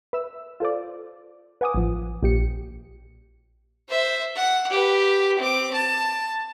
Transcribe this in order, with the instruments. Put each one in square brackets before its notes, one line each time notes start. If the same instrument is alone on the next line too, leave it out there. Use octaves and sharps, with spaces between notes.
[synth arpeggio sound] B4 E5 E6
F4 A4 C5 D5
B4 F#5 G#5 D6 D#6
A1 F3
A#1 G4 C#7
[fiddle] C5 E5
F#5
G4 B4
C4 D6
A5